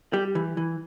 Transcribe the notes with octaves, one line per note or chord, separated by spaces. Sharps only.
G3 G4
E3
E3